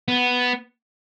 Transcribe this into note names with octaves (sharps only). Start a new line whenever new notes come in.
B3